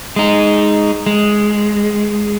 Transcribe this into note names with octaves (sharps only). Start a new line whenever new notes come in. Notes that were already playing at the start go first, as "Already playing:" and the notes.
G#3 D#4
G#3